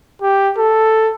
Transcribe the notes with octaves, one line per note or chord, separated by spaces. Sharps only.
G4
A4